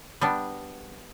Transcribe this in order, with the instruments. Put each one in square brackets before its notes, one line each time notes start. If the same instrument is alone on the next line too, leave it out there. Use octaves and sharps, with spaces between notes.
[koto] G3 B3 D4